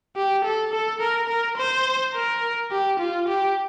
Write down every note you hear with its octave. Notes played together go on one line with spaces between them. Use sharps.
G4
A4
A4
A#4
A#4
C5
A#4
G4
F4
G4